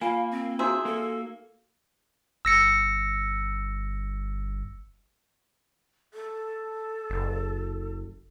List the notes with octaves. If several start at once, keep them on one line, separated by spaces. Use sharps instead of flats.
A#3 F4 F5 G#5
C4
D#4 F#4 G#4 C5 E5 A#5
A#3 A4
G1 E6 A#6 C#7
A4
F#1